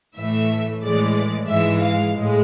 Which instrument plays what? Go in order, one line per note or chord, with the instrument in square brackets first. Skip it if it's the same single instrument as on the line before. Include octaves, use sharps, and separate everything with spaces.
[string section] A2 E3 A3 E5
A2 E3 G#3 D5
G#2 E3 G#3 E5
F5
A2 G#3